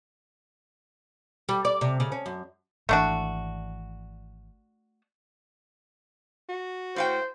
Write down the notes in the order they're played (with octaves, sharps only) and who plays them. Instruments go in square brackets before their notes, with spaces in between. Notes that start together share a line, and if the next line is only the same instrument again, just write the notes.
[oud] G3
D5
C3
C#3
C#4
F#2
[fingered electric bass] G#1 E3 [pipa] A3 D4 F#4
[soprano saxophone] F#4
[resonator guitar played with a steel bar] A2 F5 G5 [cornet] C5